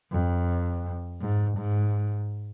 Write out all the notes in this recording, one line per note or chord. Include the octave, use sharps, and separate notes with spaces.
F2
G#2
G#2